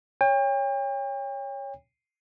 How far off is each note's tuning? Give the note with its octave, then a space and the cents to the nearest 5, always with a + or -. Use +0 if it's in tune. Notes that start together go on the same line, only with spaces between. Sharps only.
C#5 +0 G5 +40